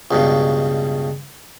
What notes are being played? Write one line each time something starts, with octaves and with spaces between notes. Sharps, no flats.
C#2 G2 B2